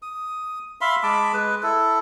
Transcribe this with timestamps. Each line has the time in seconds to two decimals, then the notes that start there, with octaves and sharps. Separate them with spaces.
0.02 D#6
0.81 E5 F5 B5 C6
1.03 G#3 A5 B5 D6
1.33 G#3 B4
1.63 E4 A4